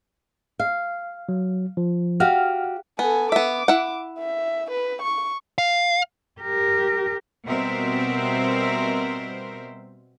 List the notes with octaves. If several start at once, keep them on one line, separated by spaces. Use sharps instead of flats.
F5
F#3
F3
F#4 G4 F5 F6
B3 A4 G#5
B3 E5 D6
E4 F#5
E5
B4
C#6
F5
G4 A#4
B2 G3 C4 A#4 C5 E5